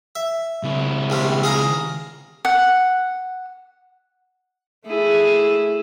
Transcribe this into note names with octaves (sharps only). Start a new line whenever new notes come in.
E5
C#2 E4
A#1 C3 G3
G#4 F5 A#5
F#5
A3 E4 G#4